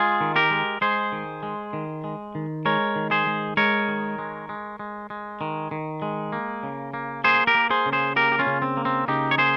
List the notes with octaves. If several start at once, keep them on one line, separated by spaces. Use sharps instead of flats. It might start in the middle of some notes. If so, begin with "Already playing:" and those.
Already playing: G#3 F4 G#4
D#3
G4 A#4
G#3
G#3 G#4 C5
D#3
G#3
D#3
G#3
D#3
G#3 A#4 C#5
D#3
G#4 C5
G#3
G#3 A#4 C#5
D#3
G#3
G#3
G#3
G#3
D#3
D#3
G#3
A#3
C#3
A#3
A#3 G#4 C5
G4 A#4
A#3
G#4 C5
C#3
G#4 C5
A#3 G4 A#4
G4
C#4 F4
C#3
C4
A#3
C4
C#3 D#4 G4
C#5
A#3 G#4 C5